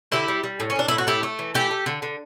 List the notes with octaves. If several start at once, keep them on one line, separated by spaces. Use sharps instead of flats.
D3 E4 G4
G3
G3
A2
C#4
A2 D4
A2 E4
F#4
A3 E4 G4
A3
E3
A3 E4 G4
A3
D3
D3